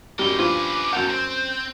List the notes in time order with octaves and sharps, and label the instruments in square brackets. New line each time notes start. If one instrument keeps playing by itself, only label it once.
[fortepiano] F#2 G3 [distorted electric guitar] A#3 D#4 [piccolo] G7
[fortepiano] G2 F3 F4 [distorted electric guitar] C#4 B4 [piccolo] D6
[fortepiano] F#2 F#5 [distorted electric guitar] A4 A#4 [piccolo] G6
[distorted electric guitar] C4